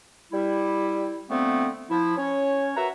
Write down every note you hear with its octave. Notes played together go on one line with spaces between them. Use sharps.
G3 E4
D3 F3 A3 B3 C4
F3 E4
C#4 C#5
F#4 A#4 B4 E5 F#5 A#5